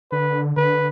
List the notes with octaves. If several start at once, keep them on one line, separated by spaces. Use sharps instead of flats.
D3 B4
D3 B4